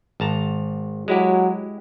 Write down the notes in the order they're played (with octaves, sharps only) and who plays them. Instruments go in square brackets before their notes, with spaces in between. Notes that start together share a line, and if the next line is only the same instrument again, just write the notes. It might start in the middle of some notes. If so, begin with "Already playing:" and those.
[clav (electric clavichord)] G#1 A5 A#5
[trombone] F#3 [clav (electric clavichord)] G#3 E4 G4